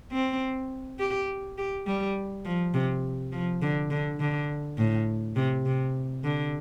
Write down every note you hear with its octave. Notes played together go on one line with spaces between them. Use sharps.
C4
G4
G4
G3
F3
C3
F3
D3
D3
D3
A2
C3
C3
D3